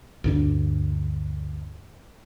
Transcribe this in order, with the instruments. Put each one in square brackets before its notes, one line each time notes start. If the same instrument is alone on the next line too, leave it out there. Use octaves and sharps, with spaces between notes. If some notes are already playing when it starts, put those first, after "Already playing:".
[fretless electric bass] D2 G2 D4